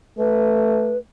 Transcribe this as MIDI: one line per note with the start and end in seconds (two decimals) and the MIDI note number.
0.18 0.99 57
0.18 0.97 71